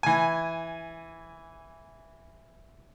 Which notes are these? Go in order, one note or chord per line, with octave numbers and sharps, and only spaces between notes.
E3 G#5